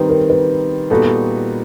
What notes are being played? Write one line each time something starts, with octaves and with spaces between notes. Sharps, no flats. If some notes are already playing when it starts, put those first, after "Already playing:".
Already playing: D#3 G3 C4 D#4 B4
A#4
B4
A#2 G3 B3 D#4 F#4 A4